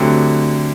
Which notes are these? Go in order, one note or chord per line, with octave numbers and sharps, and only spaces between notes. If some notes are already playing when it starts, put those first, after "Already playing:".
Already playing: D2 D3 F#3 C4 G4